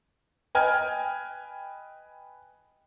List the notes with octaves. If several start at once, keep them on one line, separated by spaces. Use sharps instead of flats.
B4 D#5 G5 G#5 F6 G#6